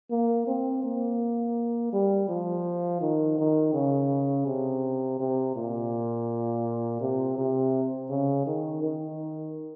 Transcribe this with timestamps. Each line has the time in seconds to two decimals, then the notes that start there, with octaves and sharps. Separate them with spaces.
0.11 A#3
0.47 C4
0.84 A#3
1.93 G3
2.28 F3
3.01 D#3
3.38 D#3
3.74 C#3
4.46 C3
5.20 C3
5.56 A#2
7.01 C3
7.38 C3
8.09 C#3
8.46 D#3
8.83 D#3